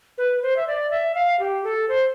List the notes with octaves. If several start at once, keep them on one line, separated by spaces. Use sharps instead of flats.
B4
C5
E5
D5
E5
F5
G4
A4
C5